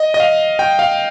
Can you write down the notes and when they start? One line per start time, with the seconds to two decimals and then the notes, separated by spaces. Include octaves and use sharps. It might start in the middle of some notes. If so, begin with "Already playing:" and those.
Already playing: D#5
0.14 D#5
0.20 F5
0.59 G5
0.79 F5